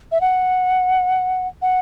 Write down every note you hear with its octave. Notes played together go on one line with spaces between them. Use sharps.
E5
F#5
F#5